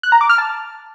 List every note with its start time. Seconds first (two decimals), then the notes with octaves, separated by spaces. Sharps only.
0.03 F#6
0.12 A#5
0.21 D6
0.29 F6
0.38 A5